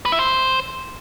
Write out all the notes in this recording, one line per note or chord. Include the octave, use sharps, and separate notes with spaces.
B4
E4
C5